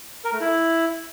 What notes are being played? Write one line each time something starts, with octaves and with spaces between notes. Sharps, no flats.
A#4
A3
E4